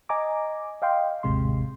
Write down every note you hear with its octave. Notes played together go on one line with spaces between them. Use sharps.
D#5 G#5 A#5 D6
D#5 F5 G5 C6
G#1 D#2 A2 C3 G#3 C6